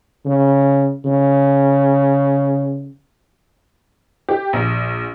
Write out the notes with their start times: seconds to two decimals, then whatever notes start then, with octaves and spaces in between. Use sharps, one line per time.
0.25 C#3
1.05 C#3
4.29 G4
4.53 A#1